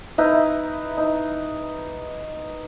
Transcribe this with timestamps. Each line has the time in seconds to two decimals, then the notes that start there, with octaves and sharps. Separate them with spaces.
0.18 D#4 E4 B4
0.97 D#4